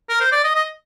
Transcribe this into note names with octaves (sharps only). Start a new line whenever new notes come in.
A#4
C5
D5
D#5
D#5